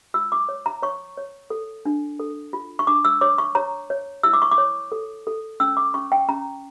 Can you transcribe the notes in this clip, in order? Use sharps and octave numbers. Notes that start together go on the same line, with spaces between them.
F4 E6
D6
C#5
A#5
C#5 C#6
C#5
A4
D4
A4
F4
C#6
D4 D6
E6
C#5 D6
C#6
C#5 A#5
C#5
E4 E6
D6
C#6
D6
C#5
A4
A4
C#4 E6
D6
C#4 C#6
G5
C#4 A#5